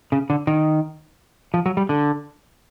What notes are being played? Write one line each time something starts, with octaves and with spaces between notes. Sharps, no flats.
C#3
D3
D#3
F3
F#3
G3
D3